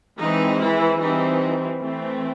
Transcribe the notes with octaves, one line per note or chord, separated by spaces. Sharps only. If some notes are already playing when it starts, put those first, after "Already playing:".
E3 G#3 C4 D#4
E3 E4
E3 G3 C4 D#4
E3 A3 C4